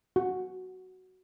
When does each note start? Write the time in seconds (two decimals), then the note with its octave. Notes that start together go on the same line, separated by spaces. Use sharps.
0.16 F#4